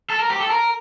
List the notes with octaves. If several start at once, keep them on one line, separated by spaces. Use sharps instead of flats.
A4
A#4
G4
A4
A#4